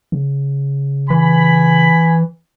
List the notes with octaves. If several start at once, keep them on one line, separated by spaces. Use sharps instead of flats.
C#3
E3 G#5 B5